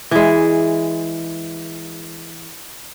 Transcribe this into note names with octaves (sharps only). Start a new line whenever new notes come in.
E3 G#3